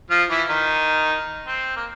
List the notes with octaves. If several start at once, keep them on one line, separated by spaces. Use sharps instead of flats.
F3 F4
E3 E4
D#3 D#4
C4
A#3